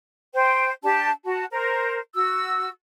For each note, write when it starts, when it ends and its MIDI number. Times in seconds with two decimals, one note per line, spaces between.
0.34 0.71 72
0.34 0.71 79
0.83 1.10 62
0.83 1.10 67
0.83 1.10 81
1.25 1.45 66
1.25 1.45 81
1.52 2.00 70
1.52 2.00 72
2.14 2.68 66
2.14 2.68 88